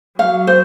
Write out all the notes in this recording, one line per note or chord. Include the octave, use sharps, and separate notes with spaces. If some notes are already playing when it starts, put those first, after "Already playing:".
F#3 F5
C5